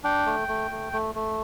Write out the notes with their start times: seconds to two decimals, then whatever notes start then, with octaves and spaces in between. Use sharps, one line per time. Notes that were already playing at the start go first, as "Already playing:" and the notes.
0.04 D4 G5
0.26 A3
0.48 A3
0.71 A3
0.93 A3
1.15 A3